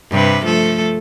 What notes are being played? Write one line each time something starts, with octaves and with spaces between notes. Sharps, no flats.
G2 C3 B4
F3 A3 A4